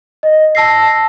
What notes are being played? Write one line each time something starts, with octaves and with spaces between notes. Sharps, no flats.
D#5
A5 E6 A#6 C7